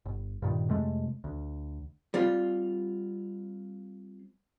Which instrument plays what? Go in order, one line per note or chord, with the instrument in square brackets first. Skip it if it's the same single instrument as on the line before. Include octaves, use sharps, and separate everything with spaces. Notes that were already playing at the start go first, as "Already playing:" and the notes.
[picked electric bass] G1
G2 A#2 D#3
F2 C3 G#3 A3
D2
[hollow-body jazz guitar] G3 C4 F4